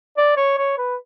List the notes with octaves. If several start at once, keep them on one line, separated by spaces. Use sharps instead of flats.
D5
C#5
C#5
B4